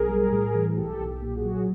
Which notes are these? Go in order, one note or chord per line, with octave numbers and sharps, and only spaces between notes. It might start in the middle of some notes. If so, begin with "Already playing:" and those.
Already playing: B1 G#4 A#4
G3
A2
E3
B1 G4 A4
B1
G4
A#2
F#4 G#4
F#3